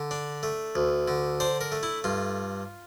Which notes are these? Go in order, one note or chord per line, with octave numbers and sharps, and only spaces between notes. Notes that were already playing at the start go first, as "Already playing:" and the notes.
Already playing: D3
D4
A3
D2
D3
D4 C5
A#4
A3
E4
G2 F4